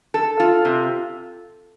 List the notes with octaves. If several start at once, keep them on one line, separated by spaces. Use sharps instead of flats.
A4
F4
C3